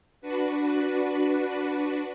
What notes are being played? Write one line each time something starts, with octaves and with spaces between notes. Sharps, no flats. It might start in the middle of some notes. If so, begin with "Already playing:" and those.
D4 F#4 B4